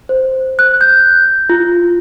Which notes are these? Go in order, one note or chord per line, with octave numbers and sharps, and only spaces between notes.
C5
F#6
G6
F4